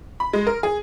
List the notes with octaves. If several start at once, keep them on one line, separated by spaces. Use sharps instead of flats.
B5
G#3
A#4
G#4